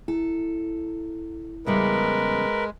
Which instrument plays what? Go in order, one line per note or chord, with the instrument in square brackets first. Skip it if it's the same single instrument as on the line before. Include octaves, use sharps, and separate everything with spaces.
[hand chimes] E4 [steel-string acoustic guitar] A4
[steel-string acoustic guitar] E2 C#3 G3 [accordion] G#3 [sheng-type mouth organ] A#4 B4